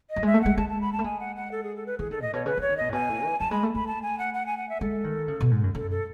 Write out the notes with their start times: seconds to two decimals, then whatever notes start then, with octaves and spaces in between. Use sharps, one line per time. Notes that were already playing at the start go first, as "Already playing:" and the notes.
0.10 D#5
0.16 F#3
0.23 G#3 E5
0.34 A3
0.42 G#3 F#5
0.57 G#3 A5
0.69 A5
0.81 B5
0.93 A5
0.99 A3
1.04 G#3 G#5
1.20 F#5
1.36 F#5
1.52 A4
1.64 G#4
1.76 A4
1.86 B4
1.99 E3 G#4
2.11 D#3 A4
2.22 A2 D#5
2.33 B2 C#5
2.46 C#3 B4
2.57 E3 C#5
2.69 D#3
2.77 B2 D#5
2.89 A2
2.92 B2 G#5
3.09 A2
3.24 E3
3.40 F#3 A5
3.51 G#3 B5
3.63 A3
3.75 A3 B5
3.87 A5
4.02 G#5
4.19 F#5
4.34 F#5
4.46 G#5
4.57 F#5
4.69 E5
4.81 G#3 A4
5.04 D#3
5.28 C#3
5.41 B2
5.51 G#2
5.63 F#2
5.75 F#2 A4
5.91 A4